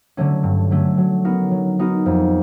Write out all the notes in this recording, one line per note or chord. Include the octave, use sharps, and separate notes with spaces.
D3 F#3 A3 C#4
G2
D3 F#3 A3 C#4
F#3
B3 D#4 F#4 A#4
F#3
B3 D#4 F#4 A#4
F2